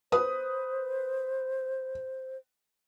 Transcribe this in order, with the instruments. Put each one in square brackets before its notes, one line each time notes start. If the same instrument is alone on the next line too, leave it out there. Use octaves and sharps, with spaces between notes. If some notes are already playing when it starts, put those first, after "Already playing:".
[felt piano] B4 D#6 [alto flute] C5